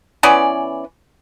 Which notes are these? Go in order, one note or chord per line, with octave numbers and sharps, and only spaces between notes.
E3 B3 C#4 D5